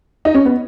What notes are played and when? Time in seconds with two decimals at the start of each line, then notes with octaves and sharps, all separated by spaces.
0.25 D#4
0.35 C#4
0.45 B3